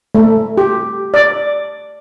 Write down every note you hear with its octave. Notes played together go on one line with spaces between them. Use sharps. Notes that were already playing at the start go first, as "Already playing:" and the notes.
A3
G4
D5